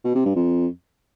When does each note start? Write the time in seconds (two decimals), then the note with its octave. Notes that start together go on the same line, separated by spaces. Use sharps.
0.04 B2
0.15 C3
0.25 G2
0.36 F2